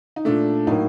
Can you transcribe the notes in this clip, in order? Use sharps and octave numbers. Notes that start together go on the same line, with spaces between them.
D#4
A#2 A3 D4
A2 F#3 A#3 D#4